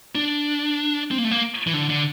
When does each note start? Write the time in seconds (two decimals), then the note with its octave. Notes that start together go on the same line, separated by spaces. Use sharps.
0.15 D4
1.11 C4
1.18 A#3
1.24 A3
1.31 A#3
1.67 E3
1.74 D3
1.90 D3